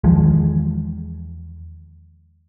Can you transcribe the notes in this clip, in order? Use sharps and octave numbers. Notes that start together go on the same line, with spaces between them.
E2 D#3 F3 G#3